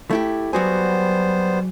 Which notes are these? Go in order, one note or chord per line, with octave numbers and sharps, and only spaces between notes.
A3 E4 G4
F#3 G3 B3 F#4 G#4 C5